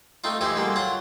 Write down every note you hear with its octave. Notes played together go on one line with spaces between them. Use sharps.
A3 C4 D#4 F4
E3 F3 G#3 D#4 G4 C5
B2 D3 G3 G#3 A#3
F#3 F4 F#5 C6